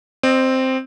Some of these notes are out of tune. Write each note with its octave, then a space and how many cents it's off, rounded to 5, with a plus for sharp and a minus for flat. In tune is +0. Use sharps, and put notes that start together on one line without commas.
C4 +0 D#5 -35